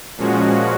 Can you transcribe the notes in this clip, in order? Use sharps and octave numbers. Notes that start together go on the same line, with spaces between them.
A#2 F3 G#3 C#4 F#4